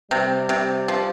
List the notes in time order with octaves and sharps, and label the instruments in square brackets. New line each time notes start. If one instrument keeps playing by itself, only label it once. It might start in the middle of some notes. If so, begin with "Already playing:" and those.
[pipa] C3 [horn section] G3
[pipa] C3
F3